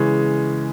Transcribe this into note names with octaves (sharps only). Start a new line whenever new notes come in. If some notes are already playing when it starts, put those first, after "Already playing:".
Already playing: C#3 E3 G#3 C#4